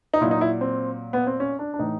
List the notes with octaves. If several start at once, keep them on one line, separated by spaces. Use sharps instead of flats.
D#4
A#2 F#3 E4
D#4
E4
C4
B3
C4
C#4
D4
D4
A2 E3 D#4